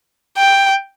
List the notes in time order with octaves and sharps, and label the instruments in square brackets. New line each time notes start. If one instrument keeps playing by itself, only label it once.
[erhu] G5